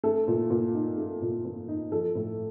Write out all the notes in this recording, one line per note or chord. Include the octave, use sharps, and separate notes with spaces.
A3 A4
A#2
A#2
D#4
A3
A#2
A#2
D#4
F3 A4
A2